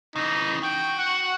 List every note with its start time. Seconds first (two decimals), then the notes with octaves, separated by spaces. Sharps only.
0.16 C#3 E3 D#4
0.63 F#4 G5
0.98 F#5